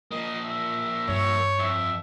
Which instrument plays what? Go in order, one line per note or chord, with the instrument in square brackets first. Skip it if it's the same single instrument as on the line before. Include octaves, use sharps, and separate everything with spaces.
[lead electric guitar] F3 A#3 [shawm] D#5
[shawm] E5
[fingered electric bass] G2 [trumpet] C#5
[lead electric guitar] F2 [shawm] E5